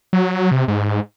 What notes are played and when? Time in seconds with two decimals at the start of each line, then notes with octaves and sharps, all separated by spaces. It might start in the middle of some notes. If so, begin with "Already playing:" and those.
0.13 F#3
0.51 C3
0.68 G#2